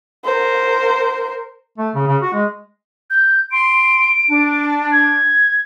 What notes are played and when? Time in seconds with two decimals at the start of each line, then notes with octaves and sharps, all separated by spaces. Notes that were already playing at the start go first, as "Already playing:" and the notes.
0.24 A#4 C5
1.78 A3
1.95 C#3
2.07 C#3
2.22 F#4
2.34 G#3
3.10 G6
3.51 C6 D7
4.29 D4
4.92 G#6